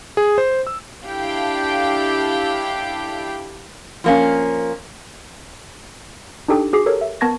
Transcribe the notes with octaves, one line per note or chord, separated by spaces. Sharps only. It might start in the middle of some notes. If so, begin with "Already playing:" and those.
G#4
C5
E6
D4 E4 G4 A4 F5 G5
F3 A#3 C#4
D4 D#4 G4 A4 G5 D#6
F#4 G#4 D6 C7
G4 A4 A#4 C#5
E5
B3 A#4 A5 C#6 G#6 A#6